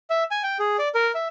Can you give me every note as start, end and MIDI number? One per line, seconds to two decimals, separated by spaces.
0.10 0.24 76
0.31 0.42 80
0.43 0.58 79
0.59 0.77 68
0.79 0.88 74
0.95 1.12 70
1.15 1.28 76